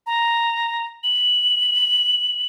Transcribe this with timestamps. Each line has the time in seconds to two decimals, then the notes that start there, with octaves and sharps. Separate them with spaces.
0.07 A#5
1.04 F#7